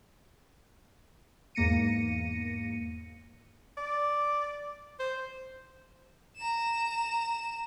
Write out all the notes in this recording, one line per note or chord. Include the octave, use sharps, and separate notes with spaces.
E2 G#2 A#3 A#6 C#7 D#7
D5
C5
A#5 E7